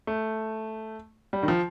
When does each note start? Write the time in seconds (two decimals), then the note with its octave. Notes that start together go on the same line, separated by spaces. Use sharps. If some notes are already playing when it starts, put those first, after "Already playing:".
0.07 A3
1.33 G3
1.43 D#3
1.48 F3